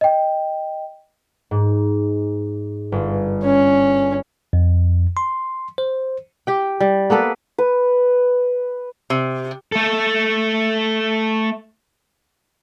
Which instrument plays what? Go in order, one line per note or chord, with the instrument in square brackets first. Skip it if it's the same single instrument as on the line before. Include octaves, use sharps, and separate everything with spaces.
[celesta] D#5 G5
[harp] G#2
G1
[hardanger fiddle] C#4
[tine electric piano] F2
C6
C5
[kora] G4 G5
G3
A#3 B3 A4 B4
[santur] B4
[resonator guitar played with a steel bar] C3
[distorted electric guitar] A3 A4